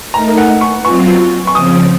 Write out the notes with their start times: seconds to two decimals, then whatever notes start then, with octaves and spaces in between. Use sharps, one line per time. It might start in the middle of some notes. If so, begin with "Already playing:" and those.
0.14 A3 D#4 A#4 A#5
0.38 F#5
0.61 C#6
0.85 F#3 C4 F4 C#6
1.47 C#6
1.55 C#3 F3 C4 D#6